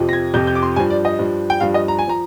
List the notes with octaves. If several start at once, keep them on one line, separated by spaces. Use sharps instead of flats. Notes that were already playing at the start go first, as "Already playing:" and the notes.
Already playing: F2 C3 F3
A#6
G#6
F2 C3 F3 G6
G6
D6
C6
G2 F3 G#5
D5
D#5
G2 F3
G5
G2 F3 F5
D#5
A#5
G#5
F3 A#5